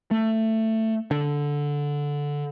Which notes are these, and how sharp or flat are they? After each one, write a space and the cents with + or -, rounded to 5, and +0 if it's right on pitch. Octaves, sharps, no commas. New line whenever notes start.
A3 +15
D3 -10